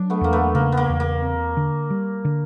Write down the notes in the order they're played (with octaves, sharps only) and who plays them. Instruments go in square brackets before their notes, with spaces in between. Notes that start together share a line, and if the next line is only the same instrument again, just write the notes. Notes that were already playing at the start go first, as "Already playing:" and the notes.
Already playing: [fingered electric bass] F#3 [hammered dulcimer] D4
[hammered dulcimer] A3 B3
[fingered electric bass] E2 [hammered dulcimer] A#3
[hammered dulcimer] A3 B3
[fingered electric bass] C#3 [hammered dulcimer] A#3
[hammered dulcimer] B3
A#3
[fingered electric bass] E2
[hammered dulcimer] A#3
[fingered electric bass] C4
D3
G3
D3